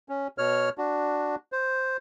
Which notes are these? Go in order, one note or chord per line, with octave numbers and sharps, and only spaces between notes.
C#4
B2 C#5 F6
D4 F#4
C5